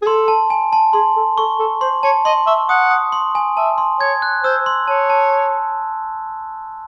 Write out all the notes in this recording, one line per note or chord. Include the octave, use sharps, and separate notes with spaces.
G#4
A4 C6
A5
G#5
A5
G#4 C6
A4
A4 C#6
A4
C5 C6
C#5 A5
D#5 C6
E5 C#6
F#5 D#6
D#6
C6
G#5
E5 A5
C6
C#5 G#6
F#6
C5 E6
C6
C#5 A5
A5